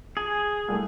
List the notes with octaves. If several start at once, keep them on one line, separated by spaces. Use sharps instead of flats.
G#4 G#5
C2 A3